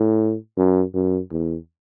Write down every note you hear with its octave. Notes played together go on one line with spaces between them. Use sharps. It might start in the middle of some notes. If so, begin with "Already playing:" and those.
Already playing: A2
F#2
F#2
E2